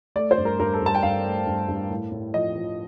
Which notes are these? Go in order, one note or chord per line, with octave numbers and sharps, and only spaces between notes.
A3 D5
C5
G2
A#4
G2 A#4
A4
G2 A5
G5
G2 F5
A3
G2
G2
A2
A2
F3 D#5
F3